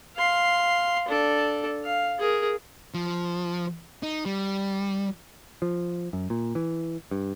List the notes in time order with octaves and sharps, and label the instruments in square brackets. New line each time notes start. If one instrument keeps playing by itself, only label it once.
[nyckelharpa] F5 C6
D4 A4
F5
G#4 A#4
[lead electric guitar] F3
D#4
G3
[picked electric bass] F3
F#2
A#2
E3
G2